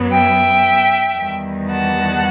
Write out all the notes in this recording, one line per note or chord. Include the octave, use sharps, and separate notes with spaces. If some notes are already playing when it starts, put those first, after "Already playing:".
Already playing: F#2 F#3 B3
E5 G5
E2 D#3 G3
F#5 A5